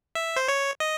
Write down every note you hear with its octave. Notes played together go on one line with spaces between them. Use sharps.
E5
C5
C#5
D#5